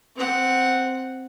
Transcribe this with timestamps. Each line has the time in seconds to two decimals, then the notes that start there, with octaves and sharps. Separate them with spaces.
0.16 C4 F#5